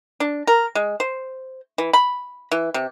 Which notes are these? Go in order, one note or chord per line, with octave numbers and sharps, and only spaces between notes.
D4
A#4
G#3
C5
E3
B5
E3
C3